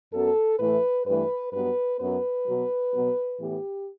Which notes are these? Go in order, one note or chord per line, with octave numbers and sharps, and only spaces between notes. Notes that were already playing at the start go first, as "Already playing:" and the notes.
F#2 F#3 B3 A4
A2 E3 A3 B4
G2 E3 A3 B4
G2 F#3 B3 B4
F#2 F#3 B3 B4
B2 F#3 B3
B2 F#3 B3
A2 E3 B3 G4